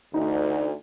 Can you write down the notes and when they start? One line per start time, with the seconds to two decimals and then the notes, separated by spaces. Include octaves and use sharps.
0.14 D2 D#4